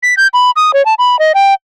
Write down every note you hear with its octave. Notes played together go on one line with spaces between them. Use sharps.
B6
G6
B5
D#6
C#5
A5
B5
D#5
G5